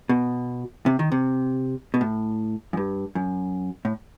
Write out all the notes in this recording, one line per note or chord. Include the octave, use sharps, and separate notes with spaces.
B2
C3
D#3
C3
B2
A2
F#2
G2
F#2
A2